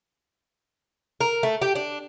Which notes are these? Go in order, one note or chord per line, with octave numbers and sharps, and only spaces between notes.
A#4
A3
G4
D4